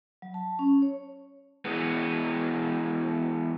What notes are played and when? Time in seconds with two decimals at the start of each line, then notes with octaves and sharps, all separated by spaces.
0.22 F#3
0.34 A5
0.59 C#4
0.82 C#5
1.65 E3 G#3 B3